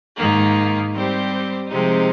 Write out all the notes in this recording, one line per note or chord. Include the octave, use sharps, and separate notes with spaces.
G#2 D#3 A#3
G3 C4 G4 C5
C3 F3 G#3 C4 D#4